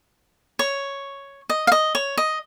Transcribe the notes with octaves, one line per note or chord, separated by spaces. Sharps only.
C#5
D#5
F5
D#5
C#5
D#5